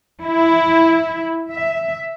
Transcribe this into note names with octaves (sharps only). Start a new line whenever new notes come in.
E4
E5